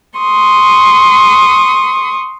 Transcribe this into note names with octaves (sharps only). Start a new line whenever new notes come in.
C6 C#6 D#6